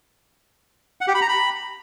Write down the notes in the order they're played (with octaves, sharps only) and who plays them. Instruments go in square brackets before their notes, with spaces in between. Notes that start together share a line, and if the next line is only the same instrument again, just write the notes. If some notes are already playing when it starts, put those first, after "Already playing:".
[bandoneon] F#5
G4
B5
A#5
B5